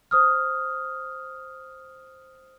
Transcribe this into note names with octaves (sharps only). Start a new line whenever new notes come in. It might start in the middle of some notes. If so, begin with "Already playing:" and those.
C5 D#6 F6